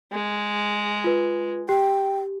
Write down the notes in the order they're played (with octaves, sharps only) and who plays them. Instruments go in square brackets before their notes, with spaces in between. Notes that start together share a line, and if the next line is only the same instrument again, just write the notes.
[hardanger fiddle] G#3
[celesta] F4 B4
[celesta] G4 [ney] G5